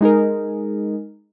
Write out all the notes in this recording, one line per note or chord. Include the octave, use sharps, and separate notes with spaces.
G#3 D#4 G#4 A#4